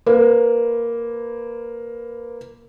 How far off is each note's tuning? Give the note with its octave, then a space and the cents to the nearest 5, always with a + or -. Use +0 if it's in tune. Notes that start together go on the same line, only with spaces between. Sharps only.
A#3 +0 B4 +15